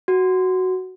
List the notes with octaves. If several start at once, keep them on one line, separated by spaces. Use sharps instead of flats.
F#4